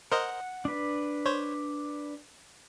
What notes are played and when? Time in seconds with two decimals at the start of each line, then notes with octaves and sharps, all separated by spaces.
0.11 A#4 C5 D#5 F#5
0.65 D4 B4
1.26 C5 C#5